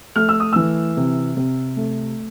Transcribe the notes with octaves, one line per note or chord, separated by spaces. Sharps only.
A3 F6
E6
D#6
E3 E6
C3
C3
A3